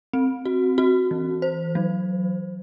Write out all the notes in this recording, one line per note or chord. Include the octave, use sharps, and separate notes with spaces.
C4
F#4
F#4
E3
C5
F#3